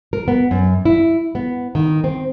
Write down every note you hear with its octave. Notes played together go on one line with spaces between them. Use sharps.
A#4
B3
F#2
E4
B3
D#3
C4